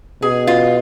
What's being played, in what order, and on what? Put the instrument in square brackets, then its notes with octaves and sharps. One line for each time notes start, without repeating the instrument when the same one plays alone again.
[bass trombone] B2 [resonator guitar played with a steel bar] G#4
[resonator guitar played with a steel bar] F4